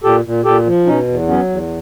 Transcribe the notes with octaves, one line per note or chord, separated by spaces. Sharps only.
A#2 G4 A4
A#2
A#2 G4 A4
F3
B2 C#4 D#4
E2
F#3 B3 C#4
E2